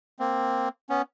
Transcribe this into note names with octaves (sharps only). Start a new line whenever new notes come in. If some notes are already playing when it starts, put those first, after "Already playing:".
A#3 C4
B3 C#4